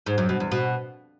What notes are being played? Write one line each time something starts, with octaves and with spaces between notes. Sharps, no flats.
G#2
F#2
B2
E2
B2